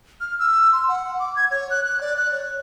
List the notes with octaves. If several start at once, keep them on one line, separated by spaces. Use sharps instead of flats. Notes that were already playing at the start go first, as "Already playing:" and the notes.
F6
E6
C6
F#5
D6
G#6
C#5
F#6
F#6
D5
F#6
C#5